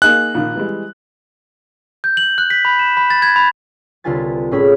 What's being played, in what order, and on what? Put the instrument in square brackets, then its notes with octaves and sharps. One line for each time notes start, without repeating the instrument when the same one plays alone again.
[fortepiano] A#3 D#4 G#4 [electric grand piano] F#6
[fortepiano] A#1 D#3
E3 G3 G#3
[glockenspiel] G6
F#7
F#6
B6
B5
E7
B5
A6
G#6
B5
[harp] C2 D3 F4 B4 G#5 A6
A2 C#4 G#4 B5 G#6